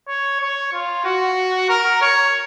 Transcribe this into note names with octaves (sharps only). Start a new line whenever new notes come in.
C#5
C#5
F4
F#4
A#4
C#5